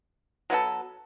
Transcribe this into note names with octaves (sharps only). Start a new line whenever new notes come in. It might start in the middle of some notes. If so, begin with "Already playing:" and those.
F#3 B3 F#4 A4